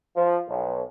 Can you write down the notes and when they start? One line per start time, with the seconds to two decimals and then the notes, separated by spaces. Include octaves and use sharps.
0.16 F3
0.48 B1